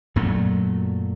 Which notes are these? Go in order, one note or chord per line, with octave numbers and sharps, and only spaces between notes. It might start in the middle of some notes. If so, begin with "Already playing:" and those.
F#2 A#2 F#3 A3